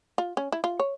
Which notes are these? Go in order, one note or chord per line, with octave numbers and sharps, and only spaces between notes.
F4
C#4
E4
F4
C#5